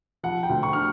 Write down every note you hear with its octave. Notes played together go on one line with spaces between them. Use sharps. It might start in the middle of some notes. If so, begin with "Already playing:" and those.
F3 F#5
G5
D2
C#6
D3 F6